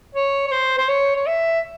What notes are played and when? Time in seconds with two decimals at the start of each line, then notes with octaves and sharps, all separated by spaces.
0.15 C#5
0.47 C#5
0.52 C5
0.78 C5
0.89 C#5
1.16 C#5
1.26 E5